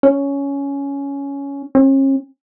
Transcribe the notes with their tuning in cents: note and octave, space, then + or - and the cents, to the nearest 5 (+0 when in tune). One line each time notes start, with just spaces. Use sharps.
C#4 +10
C#4 -40